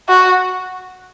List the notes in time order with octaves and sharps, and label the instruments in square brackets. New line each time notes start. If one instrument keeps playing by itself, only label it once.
[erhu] F#4